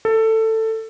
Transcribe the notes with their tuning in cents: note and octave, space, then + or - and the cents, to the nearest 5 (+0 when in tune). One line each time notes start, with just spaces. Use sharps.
A4 +15